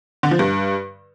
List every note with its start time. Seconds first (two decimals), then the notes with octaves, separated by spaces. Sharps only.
0.23 D3
0.31 F3
0.39 G2